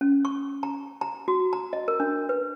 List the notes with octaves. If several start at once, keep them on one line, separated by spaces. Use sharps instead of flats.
C#4
C#6
A#5
A#5
F#4
A#5
D#5
A#4
D4
B4